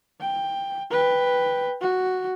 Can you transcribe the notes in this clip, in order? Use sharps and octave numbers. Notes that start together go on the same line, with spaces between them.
G5
B4 G5
F#4